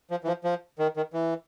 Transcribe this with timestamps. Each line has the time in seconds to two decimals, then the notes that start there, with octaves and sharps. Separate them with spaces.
0.11 F3
0.24 E3
0.27 F3
0.44 F3
0.79 D#3
0.97 D#3
1.13 E3